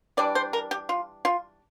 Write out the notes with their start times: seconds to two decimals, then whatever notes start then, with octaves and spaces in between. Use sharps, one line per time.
0.17 E3 G3 D4 D5
0.35 C5
0.53 A#4
0.71 G4
0.89 F4
1.25 F4